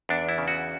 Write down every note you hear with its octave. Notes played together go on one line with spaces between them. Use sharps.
E2 D4
E4
C#3
F#4